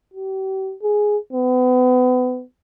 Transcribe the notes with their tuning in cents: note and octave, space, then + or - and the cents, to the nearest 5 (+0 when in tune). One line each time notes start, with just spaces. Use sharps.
G4 -40
G#4 +5
B3 +35